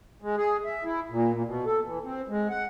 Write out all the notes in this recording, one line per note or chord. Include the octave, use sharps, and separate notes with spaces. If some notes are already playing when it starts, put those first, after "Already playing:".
G#3
G#4
E5
E4
A#2
A#2
B2
A4
E3
C4
G#3
F#5